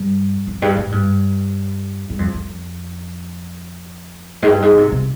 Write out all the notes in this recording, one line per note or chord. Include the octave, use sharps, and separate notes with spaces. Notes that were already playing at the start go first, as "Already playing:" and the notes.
Already playing: G2
F2
G2
G#2
G2
G2
F2
F2
G#2
G2
G#2
D3
C3
C3